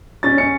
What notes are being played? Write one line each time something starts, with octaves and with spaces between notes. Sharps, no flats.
C#4 A6
C#4 C#7